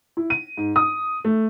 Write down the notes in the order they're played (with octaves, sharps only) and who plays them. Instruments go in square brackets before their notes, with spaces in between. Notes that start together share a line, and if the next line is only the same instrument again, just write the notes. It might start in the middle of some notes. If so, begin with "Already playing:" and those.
[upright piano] E4
D#7
G#2
D#6
A3